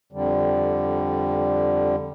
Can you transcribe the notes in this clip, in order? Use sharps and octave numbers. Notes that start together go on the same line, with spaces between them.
F2 D3 G3